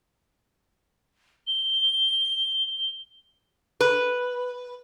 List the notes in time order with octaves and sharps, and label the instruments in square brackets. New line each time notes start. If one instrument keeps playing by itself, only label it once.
[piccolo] G7
[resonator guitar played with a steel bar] B4